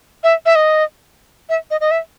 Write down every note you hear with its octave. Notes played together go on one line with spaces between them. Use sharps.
E5
E5
D#5
E5
D#5
D#5
E5